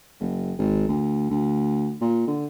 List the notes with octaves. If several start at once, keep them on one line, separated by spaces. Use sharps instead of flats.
F#1
G#1
D2
D2
A#2
D3